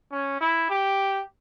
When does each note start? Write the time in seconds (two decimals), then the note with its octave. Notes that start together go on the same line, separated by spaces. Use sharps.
0.12 C#4
0.41 E4
0.70 G4